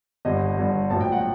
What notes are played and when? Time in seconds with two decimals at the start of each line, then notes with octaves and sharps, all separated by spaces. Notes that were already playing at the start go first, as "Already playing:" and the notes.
0.25 G1 G2 D3 G3 D#5
0.57 G1 G2 D3 G3
0.90 A#1 A2 F#3 A5
1.01 G5
1.12 F#5